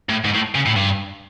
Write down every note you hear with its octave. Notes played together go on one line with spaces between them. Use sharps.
A2
G#2
A2
C#3
A2
G2